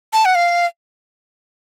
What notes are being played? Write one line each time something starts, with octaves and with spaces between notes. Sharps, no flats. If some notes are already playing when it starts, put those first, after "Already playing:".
A5
F#5
F5